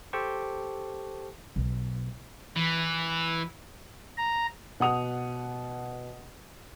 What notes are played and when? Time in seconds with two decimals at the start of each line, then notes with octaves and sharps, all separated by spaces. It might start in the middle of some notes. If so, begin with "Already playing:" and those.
0.13 G4 A4 C5 G5 A5 C#6
1.56 B1
2.56 E3
4.17 A#5
4.80 B2 F#5 D#6 F7